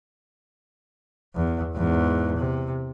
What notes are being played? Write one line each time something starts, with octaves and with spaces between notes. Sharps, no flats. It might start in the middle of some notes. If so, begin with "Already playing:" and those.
E2
E2 G#2
C3